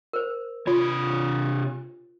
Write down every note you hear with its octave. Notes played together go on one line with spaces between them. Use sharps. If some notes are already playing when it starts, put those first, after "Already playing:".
A#4 C5
C3 F4 C#5